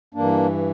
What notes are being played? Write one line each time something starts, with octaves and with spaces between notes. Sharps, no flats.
G2 E3 A#3 D4